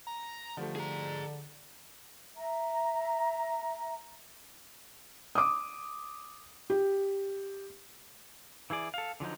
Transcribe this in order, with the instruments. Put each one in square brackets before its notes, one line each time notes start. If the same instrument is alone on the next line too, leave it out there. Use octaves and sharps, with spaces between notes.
[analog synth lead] A#5
[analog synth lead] D3 [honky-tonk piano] F3 G3 A3
[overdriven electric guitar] G#4 A#5
[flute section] E5 A#5
[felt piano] D6 D#6
G4
[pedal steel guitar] E3 E4 G#4 D5
A4 F5
D3 F3 F#3 D#4